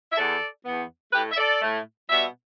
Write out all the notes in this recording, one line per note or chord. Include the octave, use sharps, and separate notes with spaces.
E5
E2 E3 B3 A4 D5
E2 E3 B3
A2 A3 G4 B4
E5
A4 D5
A2 A3
B2 G3 B3 E5